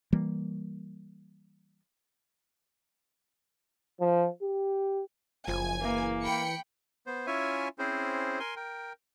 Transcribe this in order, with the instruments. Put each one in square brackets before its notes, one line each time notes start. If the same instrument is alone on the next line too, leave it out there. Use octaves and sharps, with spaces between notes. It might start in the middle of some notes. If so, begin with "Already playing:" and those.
[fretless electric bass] E3 G3 A#3
[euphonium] F3
G4
[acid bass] F#1 [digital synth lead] F3 [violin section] G#5
[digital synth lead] E3 [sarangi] A#3
[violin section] G5 B5 C#7
[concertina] B3 C5
C#4 E4 F4 C#5 E5 G#5
C4 C#4 E4 G#4 C5
A#4 G#5 C6
A#4 G5